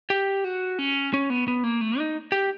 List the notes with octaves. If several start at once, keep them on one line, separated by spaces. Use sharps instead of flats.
G4
F#4
C#4
C#4
B3
B3
A#3
A3
D#4
G4